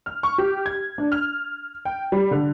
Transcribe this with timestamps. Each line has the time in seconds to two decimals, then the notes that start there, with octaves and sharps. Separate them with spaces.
0.06 F6
0.23 C#6
0.38 G4
0.66 G#6
0.98 D4
1.12 F6
1.85 G5
2.12 G3
2.31 D3